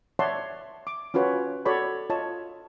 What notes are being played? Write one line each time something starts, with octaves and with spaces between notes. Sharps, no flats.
C#5 D5 E5 F#5 A5 C6
D6
C#4 F4 F#4 B4 C#5
F#4 A4 C#5 D5 B5
F4 C#5 D#5 A5